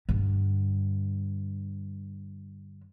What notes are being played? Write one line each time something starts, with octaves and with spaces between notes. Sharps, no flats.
G2 D3